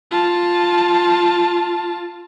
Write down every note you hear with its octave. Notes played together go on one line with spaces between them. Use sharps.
F4 A5